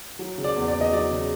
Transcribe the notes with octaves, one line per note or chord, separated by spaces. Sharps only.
F#3
C#3
D5
E2
D5
E2
D#5
F#3 D5
C#3